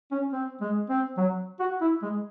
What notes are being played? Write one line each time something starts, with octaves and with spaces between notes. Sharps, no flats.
C#4
C4
G#3
C4
F#3
F#4
E4
G#3